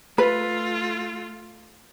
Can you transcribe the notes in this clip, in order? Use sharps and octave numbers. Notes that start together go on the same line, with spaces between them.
A3 F4 B4